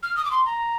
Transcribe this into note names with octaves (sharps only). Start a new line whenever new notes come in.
F6
D#6
D6
C6
A#5